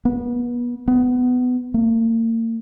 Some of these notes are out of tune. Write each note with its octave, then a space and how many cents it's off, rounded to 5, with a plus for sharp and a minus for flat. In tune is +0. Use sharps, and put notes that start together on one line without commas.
B3 -30
B3 +20
A#3 -40